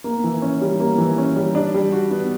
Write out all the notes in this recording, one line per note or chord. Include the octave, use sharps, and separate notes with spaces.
A#3
E3
C#4
G3
A#3
E3
C#4
G3
D4
G3
F#4
B3